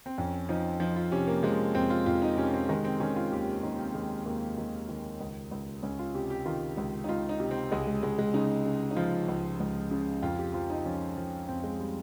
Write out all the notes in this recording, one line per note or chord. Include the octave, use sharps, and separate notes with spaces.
C4
F2 C#4
F3 D#4
F3 D#4
F4
C3 C#4
A#3
F3 G#3
F2 C4
F4
F2 F4
D#4
C3 C#4
C4
D#3 G#3
C4
D#3 C#4
F4
D#2 G4
D#2 D#4
C4
D#2 G#3
D#2 A#3
D#3
D#3
C#2
C#2
C#2 C#4
F4
C3 G4
G4
D#3 F4
C#2
D#4
C#2 F4
D#4
C3
C4
C#2 G#3
G#3
C#2 G#3
G#3
C#3 D#4
C#3
D#4
F3 F4
C#2
C#2
C#3
F2 F4
G4
F3 F4
D#4
F3 C#4
F3
F2 C4
G#3
G3